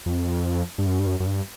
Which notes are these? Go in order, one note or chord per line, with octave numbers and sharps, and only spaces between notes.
F2
G2
F#2
G2
F#2
F#2
G2